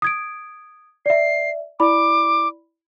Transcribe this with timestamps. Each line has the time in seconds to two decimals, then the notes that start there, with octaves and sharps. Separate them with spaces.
0.02 D#6 G#6 D7
1.06 D5 E5 C7
1.80 E4 D5 B5 D6